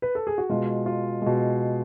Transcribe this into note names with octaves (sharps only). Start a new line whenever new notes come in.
B4
A4
G#4
F#4
B2 G#3 F4
F4
B2 G#3